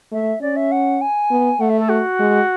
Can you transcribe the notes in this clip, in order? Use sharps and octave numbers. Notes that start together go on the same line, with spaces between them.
A3 E5
C#4 D5
E5
F#5
G#5
B3
A3 F#5
E5
A4
F#4
G#3